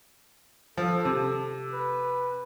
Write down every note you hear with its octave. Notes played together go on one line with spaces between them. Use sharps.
F3 A4
C3
B4